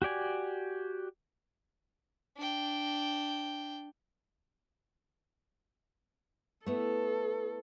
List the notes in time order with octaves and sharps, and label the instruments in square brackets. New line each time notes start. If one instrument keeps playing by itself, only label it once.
[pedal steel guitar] F#4 G4 D5 G#5
[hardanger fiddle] D4 G5
[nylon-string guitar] A3 B3 E4 [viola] A4